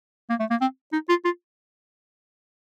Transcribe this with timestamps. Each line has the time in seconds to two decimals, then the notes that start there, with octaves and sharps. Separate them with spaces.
0.30 A#3
0.40 A3
0.50 A#3
0.61 C4
0.93 D#4
1.09 F4
1.25 F4